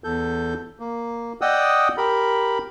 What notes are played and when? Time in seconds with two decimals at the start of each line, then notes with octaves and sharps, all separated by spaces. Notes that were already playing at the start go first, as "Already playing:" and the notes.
0.04 E2 A4 G6
0.80 A#3
1.41 D5 D#5 F#5 G5 D#6 E6
1.97 G4 A#4 B5